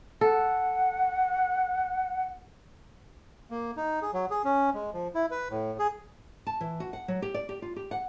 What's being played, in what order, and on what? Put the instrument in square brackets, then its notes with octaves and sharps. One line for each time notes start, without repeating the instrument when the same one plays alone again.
[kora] A4 [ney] F#5
[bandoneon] A#3
D#4
G#4
F#3
G#4
C#4
G#3
F3
E4
B4
A2
G#4
[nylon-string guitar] A5
E3
F#4
F#5
F#3
G4
D5
G4
F4
G4
F#5